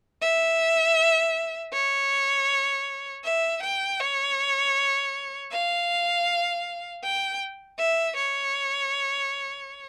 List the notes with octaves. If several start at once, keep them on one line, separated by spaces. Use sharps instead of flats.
E5
C#5
E5
G5
C#5
F5
G5
E5
C#5